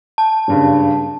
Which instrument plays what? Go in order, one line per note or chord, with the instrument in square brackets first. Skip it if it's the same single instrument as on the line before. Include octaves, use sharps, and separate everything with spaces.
[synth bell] A5
[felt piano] F#1 G2 C#3